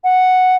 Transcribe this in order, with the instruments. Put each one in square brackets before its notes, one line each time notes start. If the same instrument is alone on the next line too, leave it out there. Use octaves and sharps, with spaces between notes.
[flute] F#5